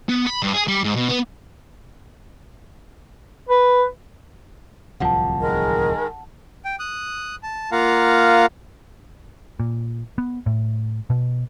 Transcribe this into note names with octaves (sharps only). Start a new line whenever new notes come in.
B3
B5
G2
G#4
G3
G#2
B2
B3
B4
D1 C2 F3 F#5 A5
D#3 G#3 A#4
G5
D#6 F#6
A5
A#3 F4 F5 F#5 A#5
A#2
B3
A2
B2